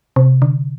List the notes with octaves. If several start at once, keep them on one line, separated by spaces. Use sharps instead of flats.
C3
D3